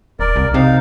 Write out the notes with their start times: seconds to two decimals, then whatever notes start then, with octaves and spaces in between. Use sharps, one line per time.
0.20 D#1 A#4 D5
0.36 C2
0.54 C3 D#4 F5